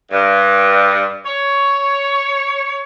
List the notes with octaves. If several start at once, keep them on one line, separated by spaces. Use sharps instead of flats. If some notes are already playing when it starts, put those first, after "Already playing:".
G2
C#5